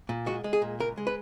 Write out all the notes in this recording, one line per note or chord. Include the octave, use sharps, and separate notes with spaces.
A#2
G#3 F#4
G#3
G#4
A#2
C#2 A#4
G#3
B4